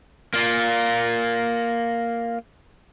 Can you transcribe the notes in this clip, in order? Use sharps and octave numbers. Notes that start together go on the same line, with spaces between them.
A#3 F4